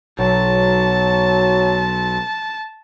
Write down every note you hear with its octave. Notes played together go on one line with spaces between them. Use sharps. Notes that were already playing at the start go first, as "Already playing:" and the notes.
B1 F#3 A5